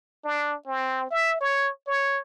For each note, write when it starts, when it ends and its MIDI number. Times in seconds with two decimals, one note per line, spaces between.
0.24 0.55 62
0.67 1.10 60
1.11 1.36 76
1.41 1.70 73
1.87 2.20 73